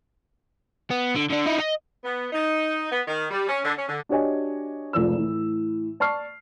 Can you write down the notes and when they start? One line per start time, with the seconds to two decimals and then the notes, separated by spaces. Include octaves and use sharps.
0.90 B3
1.15 D3
1.30 D3 D4
1.46 D#4 E4
1.60 D#5
2.03 B3
2.32 D#4
2.90 B3
3.06 D#3
3.31 G3
3.48 C#4
3.62 D3
3.76 C#4
3.88 D3
4.09 D4 F#4 G4 C#5 D#5 G#5
4.93 F1 C#2 F3 D5 E6
5.17 A2 E3
6.00 D5 A5 C#6 F6 C7